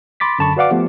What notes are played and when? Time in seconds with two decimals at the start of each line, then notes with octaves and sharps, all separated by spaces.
0.20 B5 C6 D6 A6 B6
0.39 F#2 D3 A5 B5 C#6
0.57 F#4 B4 D5 F5 F#5 D6
0.71 F3 A3 B3 G4